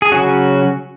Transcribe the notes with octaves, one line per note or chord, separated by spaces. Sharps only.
G#4
C#3 F#3 C#4 F#4